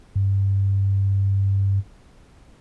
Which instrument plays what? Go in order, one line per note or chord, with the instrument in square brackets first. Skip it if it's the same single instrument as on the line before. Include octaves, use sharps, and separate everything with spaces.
[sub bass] G2